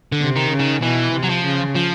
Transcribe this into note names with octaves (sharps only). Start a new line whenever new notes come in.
D3
C3
D#3
C#3
D#3
B2 E3
C3
F#3
F3
C#3
F3